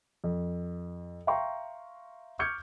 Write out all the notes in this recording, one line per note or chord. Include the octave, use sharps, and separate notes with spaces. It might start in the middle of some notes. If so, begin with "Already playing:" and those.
F2
E5 F5 G5 A#5 C6 C#6
C#6 D6 F6 G6 G#6 C#7